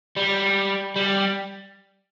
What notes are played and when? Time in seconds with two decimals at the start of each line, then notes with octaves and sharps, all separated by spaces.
0.16 G3
0.96 G3